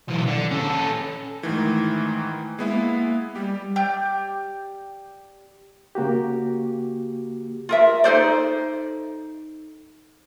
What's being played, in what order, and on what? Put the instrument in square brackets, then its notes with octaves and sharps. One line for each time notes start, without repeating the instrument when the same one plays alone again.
[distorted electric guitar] B1 E3
D3
C#4 A4
[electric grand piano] G#2 D#3 E3 [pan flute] A3
[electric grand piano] G#3 B3 E4 [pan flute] A#3
[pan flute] G3 [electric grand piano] G4
[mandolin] G4 D5 G6
[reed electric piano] C#3 A#3 F#4 G4
[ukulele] F4 A#4 E5
D#4 A4 C5 D5